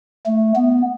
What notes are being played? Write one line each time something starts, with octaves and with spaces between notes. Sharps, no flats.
A3
B3